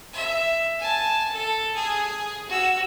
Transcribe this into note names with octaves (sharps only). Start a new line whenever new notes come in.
E5
G#5 A5
A4
G#4
F#4 E6